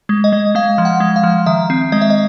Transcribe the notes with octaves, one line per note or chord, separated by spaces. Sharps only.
G#3
D#5
G#3
G#3 F5
F3
F#5
G#3
F5
F3
D#3 E5
C4
G#3 D#5
E5
D#5